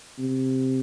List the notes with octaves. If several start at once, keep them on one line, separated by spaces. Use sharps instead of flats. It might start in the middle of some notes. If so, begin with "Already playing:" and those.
C3